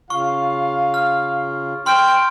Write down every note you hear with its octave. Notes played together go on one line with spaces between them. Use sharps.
C#3 F4 F5 C#6
F6
G5 C6 F6